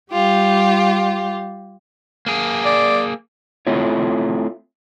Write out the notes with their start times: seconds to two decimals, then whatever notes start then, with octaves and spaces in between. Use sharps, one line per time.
0.12 G3 F4 G4
2.26 A#3 G#4
2.65 D5
3.67 A3 C4 E4 F4 C#5